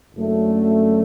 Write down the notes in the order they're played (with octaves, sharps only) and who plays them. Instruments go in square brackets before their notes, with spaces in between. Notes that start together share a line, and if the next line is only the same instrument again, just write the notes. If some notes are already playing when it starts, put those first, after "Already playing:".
[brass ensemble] F#1 F#2 F#3 A3 D4